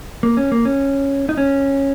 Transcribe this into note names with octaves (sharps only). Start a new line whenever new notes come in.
A#3
C#4
A#3
C#4
D#4
C#4